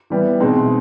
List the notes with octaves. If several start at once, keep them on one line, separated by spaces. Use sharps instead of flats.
E3 G3 B3
B2 G#3 C4 D#4 G#4